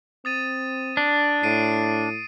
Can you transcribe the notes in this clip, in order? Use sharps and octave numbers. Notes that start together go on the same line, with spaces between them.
C4 D#6 A6 D#7
D4
A2 C7 D7 D#7